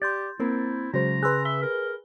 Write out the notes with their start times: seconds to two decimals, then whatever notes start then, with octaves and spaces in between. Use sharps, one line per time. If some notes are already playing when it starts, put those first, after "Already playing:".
0.02 G4 D5 C6 G6 A6
0.40 A#3 C4 E4 A#4
0.94 C#3 F#3 G#3 C5 A#5
1.23 G#4 B4 C6 E6 F#6
1.45 E5 G7
1.62 A#4